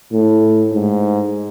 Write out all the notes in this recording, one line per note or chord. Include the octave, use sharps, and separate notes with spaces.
A2
G#2